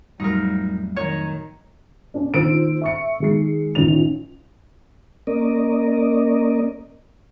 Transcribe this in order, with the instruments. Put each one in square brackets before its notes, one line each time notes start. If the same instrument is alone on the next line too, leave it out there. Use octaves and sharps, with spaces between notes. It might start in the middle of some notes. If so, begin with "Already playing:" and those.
[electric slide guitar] F2 A2 F#3 [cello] G3 [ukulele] D#4 A#4
[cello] D#3 [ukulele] C#5
[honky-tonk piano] C#4 D4
A#2 D#3 C5 E6 D7
E5 C#6 C#7
D#3 G#3 C7
A1 A#2 D#3 C#4 F7
[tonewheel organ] A#3 C#4 A#4 D5 D#5